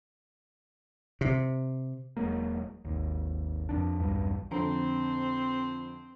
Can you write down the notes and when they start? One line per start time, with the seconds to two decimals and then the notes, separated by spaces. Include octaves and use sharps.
1.21 C3
2.17 E1 F#3 G#3 A#3
2.85 G#1 D#2
3.69 F2 D4
4.00 B1 E2 G2
4.51 F2 D3 C4 A#5